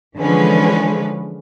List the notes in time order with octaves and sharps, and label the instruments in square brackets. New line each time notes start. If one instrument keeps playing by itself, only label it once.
[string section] D3 E3 F3 G#3 C#4 B4